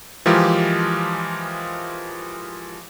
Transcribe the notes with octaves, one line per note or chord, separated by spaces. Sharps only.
E3 F3 G#3 F4 G4 A#4